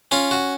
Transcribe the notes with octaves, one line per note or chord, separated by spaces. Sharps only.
C#4 F4
F#4